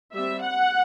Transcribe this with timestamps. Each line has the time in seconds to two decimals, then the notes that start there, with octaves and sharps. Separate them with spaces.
0.14 G3 C4 E5
0.43 F#5